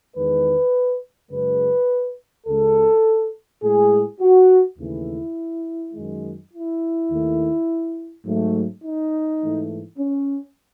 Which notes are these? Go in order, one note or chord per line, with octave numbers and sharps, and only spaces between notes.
E2 D#3 G#3 B4
F#2 C#3 G#3 B4
C#2 C#3 G#3 A4
A2 G#3 G#4
F#4
D#2 C#3 E3 A3 E4
F#2 D#3 G#3
E4
D#2 D#3 A3
G#2 F#3 A3
D#4
G#2 E3 A3
C#4